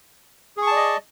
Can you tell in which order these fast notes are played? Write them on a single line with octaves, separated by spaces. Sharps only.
G#4 C#6 A5 D5 D#5